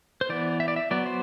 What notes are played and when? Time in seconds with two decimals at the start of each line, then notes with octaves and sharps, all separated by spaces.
0.21 C5
0.29 E3 B3 D5
0.60 E5
0.68 D5
0.76 E5
0.91 F#3 B3 D5
1.06 C5